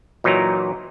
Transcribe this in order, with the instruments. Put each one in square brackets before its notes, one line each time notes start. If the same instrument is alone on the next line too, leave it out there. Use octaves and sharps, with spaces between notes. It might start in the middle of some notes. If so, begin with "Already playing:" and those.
[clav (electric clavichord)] A#2 E3 F#3 D#4 A#5